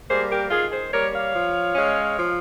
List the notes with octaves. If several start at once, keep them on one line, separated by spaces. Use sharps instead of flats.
G3 A#3 G#4 C5
G4 A#4
D#3 F4 G#4
G#4 C5
G3 A#3 A#4 C#5
C#5 F5
F3
G#3 C#4
F3